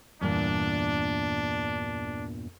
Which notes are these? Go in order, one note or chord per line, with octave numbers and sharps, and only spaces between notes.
E2 G2 A#2 D4